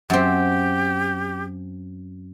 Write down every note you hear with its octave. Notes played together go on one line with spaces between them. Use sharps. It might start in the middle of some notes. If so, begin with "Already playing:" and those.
F#2 C4 G4